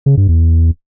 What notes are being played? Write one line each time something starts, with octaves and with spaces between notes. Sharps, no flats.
C#3
G2
E2